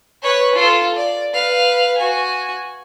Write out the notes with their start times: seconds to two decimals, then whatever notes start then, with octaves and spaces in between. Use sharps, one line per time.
0.23 B4 C#5
0.55 F4 A4
0.95 D5
1.33 B4 F5
1.98 F#4 G#5